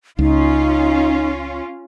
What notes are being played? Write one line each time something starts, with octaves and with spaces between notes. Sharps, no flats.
C#2 C#4 D#4 F4